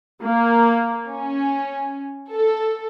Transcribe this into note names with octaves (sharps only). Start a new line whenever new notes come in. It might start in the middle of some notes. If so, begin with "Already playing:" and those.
A#3
C#4
A4